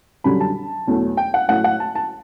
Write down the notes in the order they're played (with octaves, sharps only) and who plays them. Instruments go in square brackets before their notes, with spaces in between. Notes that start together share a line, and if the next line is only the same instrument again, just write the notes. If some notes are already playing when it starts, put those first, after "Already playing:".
[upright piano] F#2 D3 G3 B5
A5
E2 B2 F#3 A3
G5
F#5
A2 F#3 A3 F#5
F#5
A5
A5